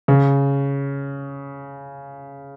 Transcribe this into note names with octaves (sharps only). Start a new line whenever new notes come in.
C#3